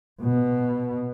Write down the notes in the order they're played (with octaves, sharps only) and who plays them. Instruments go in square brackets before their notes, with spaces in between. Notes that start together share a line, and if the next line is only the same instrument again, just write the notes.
[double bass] B2